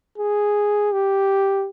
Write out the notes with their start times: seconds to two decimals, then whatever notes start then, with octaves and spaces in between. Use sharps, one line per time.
0.18 G#4
0.92 G4